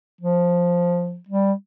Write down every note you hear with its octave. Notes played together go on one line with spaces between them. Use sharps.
F3
G3